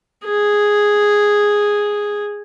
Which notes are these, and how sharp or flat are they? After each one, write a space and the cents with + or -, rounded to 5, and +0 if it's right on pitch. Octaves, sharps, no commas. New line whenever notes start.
G#4 -5